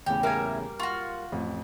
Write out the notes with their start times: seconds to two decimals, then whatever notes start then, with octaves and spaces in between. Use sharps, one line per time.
0.06 E2 A2 C#3 G4
0.23 G3 A#3 A#4 E5 G#5
0.80 F4 F#4 C#6
1.32 A1 F2